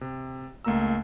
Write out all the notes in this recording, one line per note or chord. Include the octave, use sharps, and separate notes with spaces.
C3
C#2 A3 A#3 A#5 E6